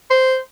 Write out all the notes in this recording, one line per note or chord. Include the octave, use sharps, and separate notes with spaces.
C5